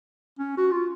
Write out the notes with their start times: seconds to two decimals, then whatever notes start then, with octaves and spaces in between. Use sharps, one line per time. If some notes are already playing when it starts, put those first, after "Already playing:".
0.39 C#4
0.58 F#4
0.71 F4